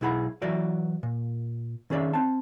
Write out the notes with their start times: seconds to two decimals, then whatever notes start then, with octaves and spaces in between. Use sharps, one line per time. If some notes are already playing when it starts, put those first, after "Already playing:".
0.01 B1 B2 E4 G#4 F#5 B5
0.42 E3 F#3 F#4 D5 E5
1.03 A#2
1.90 D#3 C#4 G#4 D5 E5
2.13 C4 A5